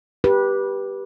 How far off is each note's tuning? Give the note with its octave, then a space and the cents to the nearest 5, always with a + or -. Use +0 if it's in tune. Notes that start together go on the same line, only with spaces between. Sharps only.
G4 +0 B4 -20